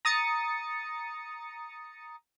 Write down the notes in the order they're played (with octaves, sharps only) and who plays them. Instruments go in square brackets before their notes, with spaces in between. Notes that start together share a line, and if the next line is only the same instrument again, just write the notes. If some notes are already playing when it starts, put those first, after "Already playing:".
[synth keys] A#5 D#6 A6 C#7